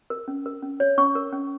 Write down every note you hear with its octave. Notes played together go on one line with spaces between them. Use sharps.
A#4
C#4
A#4
C#4
C#5
C#4 C#6
A#4
C#4